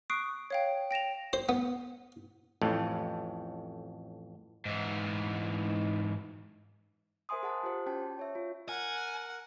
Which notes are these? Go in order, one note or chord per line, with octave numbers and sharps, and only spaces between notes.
C#6 D#6 F#6 C7 D7
C#5 F5 G5
G5 A#6 E7 F7
C5
B3
A1 F2 A2
G#2 E3
A#4 C5 E5 G#5 C6 D#6
G#4 F#5 A5
F4 G4 C5
C#4 F#4 G5 A5
C#5 E5
F4
A#4 F#5 G#5